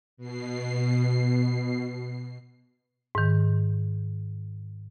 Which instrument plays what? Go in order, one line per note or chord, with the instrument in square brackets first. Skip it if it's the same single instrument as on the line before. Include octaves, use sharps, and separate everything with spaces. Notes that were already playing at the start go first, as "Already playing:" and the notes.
[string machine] B2 C7
[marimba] G#2 D#3